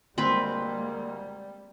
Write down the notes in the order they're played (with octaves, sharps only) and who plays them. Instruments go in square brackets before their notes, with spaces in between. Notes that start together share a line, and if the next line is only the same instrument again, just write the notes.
[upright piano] D2 C6 [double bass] G3 [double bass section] G#3 A#3 [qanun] C4 B4